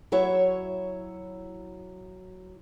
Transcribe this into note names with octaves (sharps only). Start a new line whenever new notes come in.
F#3 E4 C#5 E5